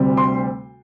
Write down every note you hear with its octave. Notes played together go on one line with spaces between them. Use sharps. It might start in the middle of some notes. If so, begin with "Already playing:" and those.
Already playing: D2 C3 G3 C4
C6